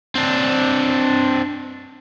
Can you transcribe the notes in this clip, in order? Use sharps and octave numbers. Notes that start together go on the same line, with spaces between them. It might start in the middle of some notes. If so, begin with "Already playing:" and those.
C4 D4